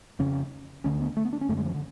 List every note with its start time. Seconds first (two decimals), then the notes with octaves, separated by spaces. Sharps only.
0.19 F2 C#3 C#4
0.84 D2 D3 C#4
1.00 B3
1.17 A3
1.25 B3
1.33 D4
1.41 C#4
1.49 F#2 D3 A3
1.57 G#3
1.65 F3
1.74 D3